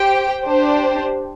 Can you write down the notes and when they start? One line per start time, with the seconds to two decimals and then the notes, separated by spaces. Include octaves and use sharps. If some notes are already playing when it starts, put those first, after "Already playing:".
Already playing: G4 C5 G5
0.44 D4 G4 C5